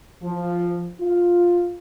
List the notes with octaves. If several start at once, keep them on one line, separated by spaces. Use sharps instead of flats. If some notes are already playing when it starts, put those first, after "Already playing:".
F3
F4